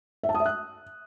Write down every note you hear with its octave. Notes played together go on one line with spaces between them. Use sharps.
E5
A5
D#6
E5
F#6